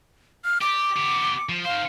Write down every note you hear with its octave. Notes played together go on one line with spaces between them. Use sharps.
F6
G4 D6
B3 G4
F3
D#3 C5 F5